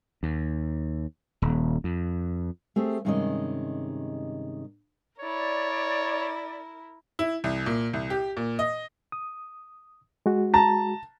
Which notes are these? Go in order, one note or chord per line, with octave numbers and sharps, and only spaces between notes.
D#2
D#1
F2
A3 C4 G4 G#4
G2 C3 D#3 G#3 C#4 D#5
E4 A#4 C#5 D5
E4
C2
A#2
C2
G4
A#2
D#5
D#6
G#3 F#4
A5 A#5